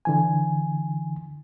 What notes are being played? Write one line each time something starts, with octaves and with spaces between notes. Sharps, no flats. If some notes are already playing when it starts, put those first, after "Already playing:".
D3 E3 G#5